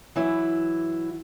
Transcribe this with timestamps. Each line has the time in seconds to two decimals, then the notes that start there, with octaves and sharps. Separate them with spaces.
0.16 E3 F#3 E4